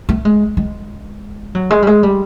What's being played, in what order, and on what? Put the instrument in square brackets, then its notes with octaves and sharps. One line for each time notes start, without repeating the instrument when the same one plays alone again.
[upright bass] A3
G#3
G#3
F#3
G#3
G3
G#3
G3